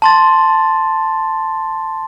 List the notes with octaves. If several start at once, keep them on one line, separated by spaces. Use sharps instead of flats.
A5 C6 A6